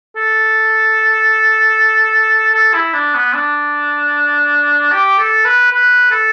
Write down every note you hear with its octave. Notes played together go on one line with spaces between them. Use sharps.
A4
A4
E4
D4
B3
D4
G4
A4
B4
B4
A4